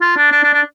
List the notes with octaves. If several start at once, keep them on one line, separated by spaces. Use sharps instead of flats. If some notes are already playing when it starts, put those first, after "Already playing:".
F4
D4
D4
D4
D4